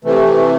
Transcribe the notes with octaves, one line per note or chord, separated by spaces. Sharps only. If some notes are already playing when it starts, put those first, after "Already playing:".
C3 E3 A3